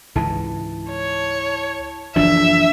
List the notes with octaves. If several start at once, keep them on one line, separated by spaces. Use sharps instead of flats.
C#2 G#2 E3 E4 A5
C#5
F#1 E3 F3 D4 E5